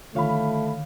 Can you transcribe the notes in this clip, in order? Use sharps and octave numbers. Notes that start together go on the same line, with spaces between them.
D3 D#3 F3 A3 C#5 F5 B5